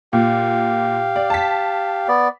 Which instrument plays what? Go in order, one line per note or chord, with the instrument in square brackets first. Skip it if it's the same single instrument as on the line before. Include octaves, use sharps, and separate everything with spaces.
[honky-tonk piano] A#2 [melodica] G4 F5
[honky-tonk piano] D5
A5 B6
[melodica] B3 D5